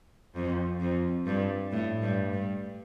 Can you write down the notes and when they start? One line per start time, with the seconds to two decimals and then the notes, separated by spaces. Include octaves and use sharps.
0.35 F2
0.80 F2
1.26 G2
1.72 A2
2.02 G2
2.33 G2